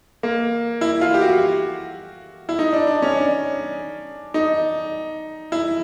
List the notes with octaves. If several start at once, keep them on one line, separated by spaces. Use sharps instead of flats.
A#3
E4
F4
G4
F#4
E4
D#4
D4
D4
C#4
D4
D#4
E4